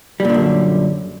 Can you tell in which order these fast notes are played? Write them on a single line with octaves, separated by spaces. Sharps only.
G3 A#2 D3 F#2